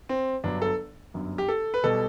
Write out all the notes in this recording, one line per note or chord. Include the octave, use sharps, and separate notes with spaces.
C4
G1 G2 F#3 D4
A4
G1 F#2 F#3
G4
A4
B4
B1 B2 G3 A4